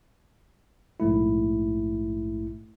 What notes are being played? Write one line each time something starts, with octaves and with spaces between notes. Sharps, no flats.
A#1 G#2 A3 E4